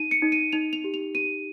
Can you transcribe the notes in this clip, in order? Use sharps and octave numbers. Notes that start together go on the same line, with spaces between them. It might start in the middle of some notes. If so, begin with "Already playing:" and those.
Already playing: D#4 D#7
C#7
D#4
D#7
D#4 F7
F7
G4
F7
G4 D#7